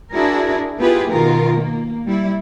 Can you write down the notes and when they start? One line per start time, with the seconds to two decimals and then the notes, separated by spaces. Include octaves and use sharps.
0.12 D4 E4 F#4 G#4 A#4
0.79 B3 E4 F4 G4 G#4 B4
1.12 B2 D#3 F4 A#4
1.59 A#3
2.06 G3 E4